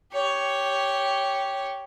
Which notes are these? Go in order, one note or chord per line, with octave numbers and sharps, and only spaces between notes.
G4 C#5